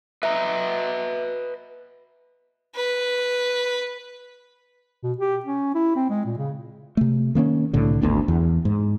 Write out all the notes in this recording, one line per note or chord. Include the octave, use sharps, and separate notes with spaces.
B4 D#5 E5 A#5
B4
B2
G4
C#4
E4
C4
G#3
A#2
C#3
C3 A3
D#3 A#3 C4 C#4
C2 A2 D3
G#1 D2 B3 D4
E2
G#2